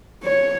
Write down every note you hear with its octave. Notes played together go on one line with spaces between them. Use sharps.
C#5